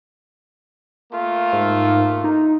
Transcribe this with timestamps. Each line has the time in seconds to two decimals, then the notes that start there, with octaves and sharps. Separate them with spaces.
1.13 A3 A#3 F4
1.52 G#2
2.24 D#4